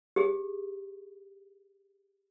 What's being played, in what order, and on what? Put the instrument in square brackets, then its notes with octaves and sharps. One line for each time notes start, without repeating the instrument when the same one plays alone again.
[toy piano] G4 G#4